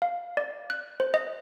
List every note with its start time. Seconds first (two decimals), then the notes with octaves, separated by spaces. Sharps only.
0.02 F5
0.37 D5
0.70 F#6
1.00 C5
1.14 D#5